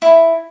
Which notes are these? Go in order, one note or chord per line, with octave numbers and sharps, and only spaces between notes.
E4